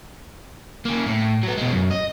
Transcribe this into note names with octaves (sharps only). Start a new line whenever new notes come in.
A#3 C#4
A2
F#3 B3
B2 G#3
F#2
D#5